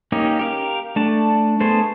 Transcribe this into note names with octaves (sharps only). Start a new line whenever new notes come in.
A#3 C#4 D#4 G4
G4 A#4 F5
A3 D4 A5
A3 B3 G#4 A4 C5